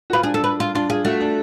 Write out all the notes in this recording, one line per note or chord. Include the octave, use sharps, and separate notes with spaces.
F#4
F4 B4
D4 G#4
D4 A4
B4
F4
D4 F4
F4 G#4
A3 F#4
D4